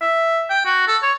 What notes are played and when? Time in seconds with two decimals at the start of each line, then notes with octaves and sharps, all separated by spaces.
0.01 E5
0.50 G5
0.65 F#4
0.87 A4
1.03 C#5